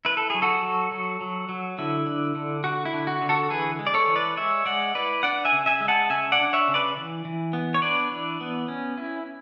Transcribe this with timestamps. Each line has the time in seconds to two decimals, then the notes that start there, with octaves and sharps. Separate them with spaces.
0.05 E4 B4
0.17 A4
0.30 F#3 G#4
0.42 F#4 A4
0.62 F#3
0.92 F#3
1.21 F#3
1.49 F#3
1.78 D3 E4
2.06 D4
2.35 D3
2.64 D3 F#4
2.85 E4
2.93 D3
3.07 F#4
3.21 D3
3.29 F#4 A4
3.50 E3 G#4 B4
3.79 G#3
3.87 D5
3.94 A4 C#5
4.08 E3
4.16 B4 D5
4.37 G#3 C#5 E5
4.66 G#3 D5 F#5
4.95 E4 B4 D5
5.23 D4 D5 F#5
5.45 E5 G#5
5.52 C#3
5.66 E5 G#5
5.80 G#3
5.88 F#5 A5
6.09 C#3 E5 G#5
6.32 D5 F#5
6.39 D4
6.53 C#5 E5
6.68 C#3
6.74 B4 D5
6.97 E3
7.25 E3
7.53 B3
7.74 C#5
7.82 D4 B4 D5
8.11 E3
8.41 B3
8.68 C#4
8.98 E4